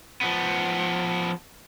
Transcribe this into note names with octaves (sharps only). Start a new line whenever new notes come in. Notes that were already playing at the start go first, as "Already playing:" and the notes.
F3 B3